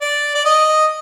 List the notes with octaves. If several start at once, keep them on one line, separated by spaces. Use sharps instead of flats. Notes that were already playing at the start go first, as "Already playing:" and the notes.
D5
D5
D#5